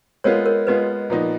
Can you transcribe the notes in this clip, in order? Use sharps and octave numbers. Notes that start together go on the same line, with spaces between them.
G#3 B3 F4 A#4 C#5
A#4 C#5
G#3 B3 F4 B4 D#5
A#2 F3 B3 D#4